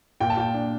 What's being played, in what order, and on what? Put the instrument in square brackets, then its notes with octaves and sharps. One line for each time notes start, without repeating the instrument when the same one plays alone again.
[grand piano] A#2 G5
A5
A#2 G5
D4